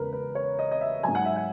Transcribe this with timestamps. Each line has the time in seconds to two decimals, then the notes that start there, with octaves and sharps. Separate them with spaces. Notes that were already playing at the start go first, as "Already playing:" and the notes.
Already playing: E2 C#3 G#3 A#4 B4
0.13 B4
0.35 C#5
0.59 D#5
0.71 D#5
0.81 E5
1.03 G#2 F#3 G#5
1.15 F#5
1.25 E5
1.36 F#5